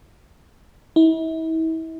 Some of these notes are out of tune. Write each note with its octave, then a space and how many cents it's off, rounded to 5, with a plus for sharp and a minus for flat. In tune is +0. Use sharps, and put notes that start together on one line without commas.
E4 -40